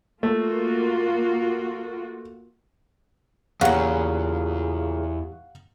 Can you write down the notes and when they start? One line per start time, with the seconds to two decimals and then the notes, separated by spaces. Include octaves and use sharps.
0.23 A3 A#3 F4 F#4
3.61 E2 A#2 C#3 G4 F5 F#5 C#6 F#6